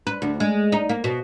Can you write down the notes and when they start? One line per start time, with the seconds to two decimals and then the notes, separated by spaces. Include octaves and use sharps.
0.07 B4
0.22 D2
0.40 G#3
0.72 D#4
0.89 A#3
1.04 B2